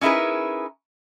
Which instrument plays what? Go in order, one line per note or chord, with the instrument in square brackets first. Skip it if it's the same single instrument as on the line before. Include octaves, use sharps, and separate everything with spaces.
[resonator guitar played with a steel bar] C#4 D#4 E4 G#4 A#4 B4